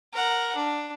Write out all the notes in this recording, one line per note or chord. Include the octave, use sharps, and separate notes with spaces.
A#4 F#5
D4